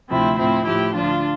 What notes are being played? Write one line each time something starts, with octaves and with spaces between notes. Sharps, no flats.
D2 C3 F3 C4 E4
A2 F3 C4 E4
A2 F3 E4 G4
D2 D3 F3 D4 F4